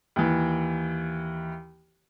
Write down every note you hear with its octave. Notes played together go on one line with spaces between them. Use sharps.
D#2 E3